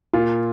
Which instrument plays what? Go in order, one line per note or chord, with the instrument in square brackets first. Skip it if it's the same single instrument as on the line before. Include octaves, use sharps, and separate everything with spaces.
[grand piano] A#2 F4